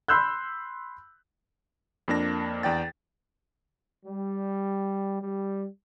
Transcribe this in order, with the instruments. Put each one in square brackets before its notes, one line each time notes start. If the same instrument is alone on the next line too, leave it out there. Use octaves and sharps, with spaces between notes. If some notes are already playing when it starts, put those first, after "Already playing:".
[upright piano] B5 C6 E6 F#6 G6
[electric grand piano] F2 A#3 D4 A#6
E2 D5 G5 A6
[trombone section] G3
G3